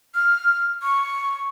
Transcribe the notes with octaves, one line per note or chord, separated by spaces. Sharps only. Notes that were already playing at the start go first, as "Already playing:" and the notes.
F6
C#6